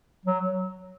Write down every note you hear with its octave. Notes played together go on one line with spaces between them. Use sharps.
F#3